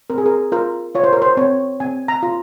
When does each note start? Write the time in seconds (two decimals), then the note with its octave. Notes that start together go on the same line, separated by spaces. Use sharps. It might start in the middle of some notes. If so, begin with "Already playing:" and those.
0.10 C4 A#4
0.18 G#4
0.26 A#4
0.52 F4 A#4
0.95 F4 C#5
1.04 C5
1.13 A#4
1.22 C5
1.37 C4 C#5
1.80 C4 G#5
2.08 A#5
2.23 F4